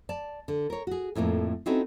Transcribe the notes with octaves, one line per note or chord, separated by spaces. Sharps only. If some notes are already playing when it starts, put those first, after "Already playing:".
D5 A5
D3
A#4 C#5
F#4 G#4
F2 A2 F3 A#3
C4 C#4 D#4 E4 F#4 A4